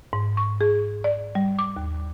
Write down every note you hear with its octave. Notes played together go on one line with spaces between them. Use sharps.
G#2
C#6
G#4
D5
G3
D6
D#2